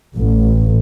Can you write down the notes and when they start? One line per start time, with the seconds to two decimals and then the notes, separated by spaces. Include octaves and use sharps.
0.17 A1